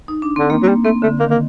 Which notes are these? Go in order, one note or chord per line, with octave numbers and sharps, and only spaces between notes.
D#4
D4
D3 C4
D#3 A#3
F#3
G3 A#3
A3 C4
D3 A3
D#3 A#3
A#3